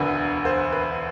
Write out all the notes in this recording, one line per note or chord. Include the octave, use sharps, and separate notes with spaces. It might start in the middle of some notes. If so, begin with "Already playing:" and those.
Already playing: E1 D2 D3 B4
C5
B4